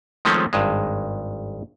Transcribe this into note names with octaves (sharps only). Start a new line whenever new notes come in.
D#3 F3 G#3 A3 C4 C#4
G#1 G2 G#3